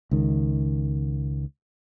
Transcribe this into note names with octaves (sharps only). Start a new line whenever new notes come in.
C#2 D#3